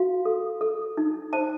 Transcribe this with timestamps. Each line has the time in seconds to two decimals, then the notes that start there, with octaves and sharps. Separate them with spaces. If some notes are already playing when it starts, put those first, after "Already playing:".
Already playing: F#4 F5
0.25 A4
0.61 A4
0.97 D#4
1.33 C5 A5